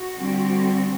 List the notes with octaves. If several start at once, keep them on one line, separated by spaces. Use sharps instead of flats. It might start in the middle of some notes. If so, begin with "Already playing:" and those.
Already playing: F#4
D3 G3 C4